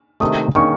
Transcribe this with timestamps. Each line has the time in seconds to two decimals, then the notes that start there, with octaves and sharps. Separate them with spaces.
0.20 C3 D#3 A3 D#6
0.55 D#3 A#3 C#4 C#6